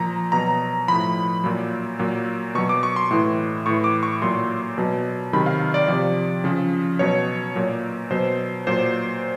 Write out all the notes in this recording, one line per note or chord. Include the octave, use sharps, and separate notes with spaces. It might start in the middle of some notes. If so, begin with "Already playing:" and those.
Already playing: A#2 F3 A#5
B2 F#3 A#5
A2 F3 B5
A#2 F#3
A#2 F#3
B2 F#3 C#6
D6
C#6
C6
A2 E3
A2 E3 C#6
D6
C#6
A#2 F#3 C6
B2 F#3
C3 D#3 F#3 B5
F5
D5
C3 F3 D5
C#3 F3
B2 F#3 C#5
A#2 F#3
B2 F#3 C5
A#2 F#3 C5